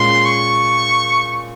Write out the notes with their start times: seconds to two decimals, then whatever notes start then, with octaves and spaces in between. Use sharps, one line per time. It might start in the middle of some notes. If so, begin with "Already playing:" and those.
Already playing: A#2 G#3 C#4 C6
0.25 C#6